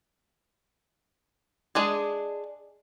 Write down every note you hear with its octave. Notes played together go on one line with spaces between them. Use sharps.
G#3 D4 G#4